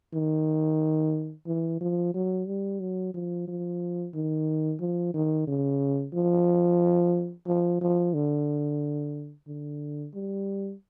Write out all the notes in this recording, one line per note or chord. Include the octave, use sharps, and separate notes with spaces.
D#3
E3
F3
F#3
G3
F#3
F3
F3
D#3
F3
D#3
C#3
F3
F3
F3
D3
D3
G3